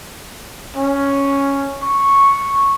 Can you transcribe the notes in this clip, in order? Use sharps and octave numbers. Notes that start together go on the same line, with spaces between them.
C#4
C#6